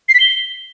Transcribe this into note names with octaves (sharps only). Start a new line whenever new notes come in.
C7
B6
G7